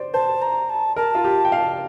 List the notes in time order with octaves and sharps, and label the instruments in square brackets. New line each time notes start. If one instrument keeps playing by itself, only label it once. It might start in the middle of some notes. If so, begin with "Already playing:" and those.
Already playing: [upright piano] C5 D5
[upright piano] C5 [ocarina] A5
[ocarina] A#5
A5
[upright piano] A#4 [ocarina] A5
[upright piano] F4
G4
G5
F5